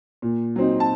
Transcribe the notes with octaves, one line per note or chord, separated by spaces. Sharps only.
A#2
F#3 C4 D#4
A5